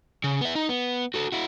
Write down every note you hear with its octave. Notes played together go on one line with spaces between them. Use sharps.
C#3
B3 E5
D#4
B3
F#4 A4
E4 F#4